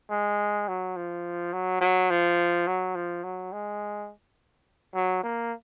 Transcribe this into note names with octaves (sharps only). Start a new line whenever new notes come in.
G#3
F#3
F3
F#3
F#3
F3
F#3
F3
F#3
G#3
F#3
A#3